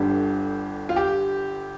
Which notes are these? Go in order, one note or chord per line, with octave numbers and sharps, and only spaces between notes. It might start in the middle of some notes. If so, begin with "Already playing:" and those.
Already playing: G1 G2 D3 G4
F4
G4